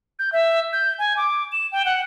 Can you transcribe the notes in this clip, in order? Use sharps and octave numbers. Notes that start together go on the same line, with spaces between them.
G6
E5
G6
G#5
D6
E7
G5
F#5